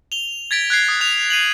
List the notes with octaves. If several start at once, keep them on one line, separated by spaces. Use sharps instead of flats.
F7 G7
G#6 A6 B6 D7
F#6 G#6 C7
D#6
F#6 F7
C7 D#7 F7 F#7